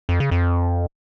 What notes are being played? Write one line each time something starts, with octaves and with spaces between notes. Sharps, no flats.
F2
C#3
F2